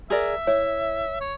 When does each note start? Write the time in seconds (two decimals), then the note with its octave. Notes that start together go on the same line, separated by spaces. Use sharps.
0.10 G#4 A#4 D5 E5
0.47 E4 C#5
1.21 C#5